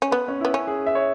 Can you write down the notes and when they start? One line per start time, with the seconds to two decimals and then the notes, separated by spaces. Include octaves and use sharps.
0.02 C#4
0.11 B3 B4
0.28 C#4
0.40 B3 E4
0.54 C#4
0.67 G#4
0.86 E5
0.95 C#5